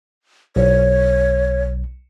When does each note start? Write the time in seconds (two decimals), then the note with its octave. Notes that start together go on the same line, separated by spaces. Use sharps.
0.56 B1 C#5